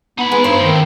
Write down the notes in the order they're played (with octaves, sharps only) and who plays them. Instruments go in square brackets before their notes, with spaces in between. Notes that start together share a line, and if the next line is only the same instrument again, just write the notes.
[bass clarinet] B3 [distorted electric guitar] D#4 B5
[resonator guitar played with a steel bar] G#3 [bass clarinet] B4
[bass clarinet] G2 [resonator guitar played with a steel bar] C5
[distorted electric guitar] A2 C4 [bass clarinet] D#3